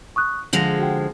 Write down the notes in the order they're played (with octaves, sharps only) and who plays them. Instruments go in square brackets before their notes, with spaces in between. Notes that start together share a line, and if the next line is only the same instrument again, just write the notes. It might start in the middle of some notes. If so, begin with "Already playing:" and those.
[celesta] C#6 D#6 F#6
[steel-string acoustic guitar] D3 F3 G#3 [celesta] A#6 F7 F#7
[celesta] F#4 F#5 G5